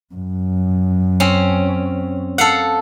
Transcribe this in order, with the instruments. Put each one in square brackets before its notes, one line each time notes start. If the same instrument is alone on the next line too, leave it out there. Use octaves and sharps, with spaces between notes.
[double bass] F#2
[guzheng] C4 C#4
A4 F5 F#5